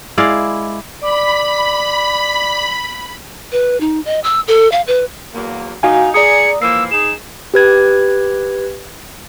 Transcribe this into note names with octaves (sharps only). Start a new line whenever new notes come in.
G#3 E4 D5 F5
D5 B5 D6
B4
D#4
D#5
E6
A4
F5
B4
E2 F#3 A#3
D#4 F#4 F5 G#5
G#4 D5 A#5 D#6 C#7
E3 F3 A#3 E6 C7
D#4 G#4 E7
G4 B4 G#6